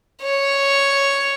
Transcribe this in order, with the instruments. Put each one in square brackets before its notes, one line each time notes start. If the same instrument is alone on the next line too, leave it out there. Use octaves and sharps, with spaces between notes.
[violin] C#5